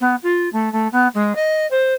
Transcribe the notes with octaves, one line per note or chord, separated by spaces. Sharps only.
B3
F4
A3
A3
B3
G#3
D#5
C5